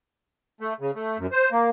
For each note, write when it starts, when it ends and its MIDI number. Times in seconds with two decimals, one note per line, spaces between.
0.61 0.73 57
0.80 0.91 49
0.95 1.17 57
1.18 1.27 42
1.32 1.49 72
1.52 1.70 58